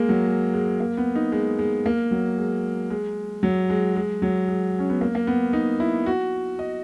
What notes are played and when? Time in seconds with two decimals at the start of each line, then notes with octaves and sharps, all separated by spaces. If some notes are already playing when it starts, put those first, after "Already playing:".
Already playing: G#3 A#3
0.09 F#3
0.27 G#3
0.54 G#3
0.80 A#3
0.97 B3
1.15 D#4
1.32 G#3
1.59 G#3
1.86 A#3
2.11 F#3
2.38 G#3
2.90 G#3
3.43 F#3
3.70 G#3
3.96 G#3
4.22 F#3
4.48 G#3
4.79 C#4
4.90 B3
5.01 A#3
5.15 A#3
5.27 B3
5.53 D#4
5.80 E4
6.06 F#4
6.59 D#5